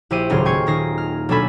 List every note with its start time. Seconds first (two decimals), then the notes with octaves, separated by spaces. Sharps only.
0.10 A#1 E4 G4 C5 D#7
0.30 D#1 C#2 A2 F#3 C6 F6
0.45 G5 G#5 C#6 G#6 C7 C#7
0.66 A#2 D#3 D#4 A#6 C7
0.98 F6
1.29 B2 F#3 D4 A4 G#5 B5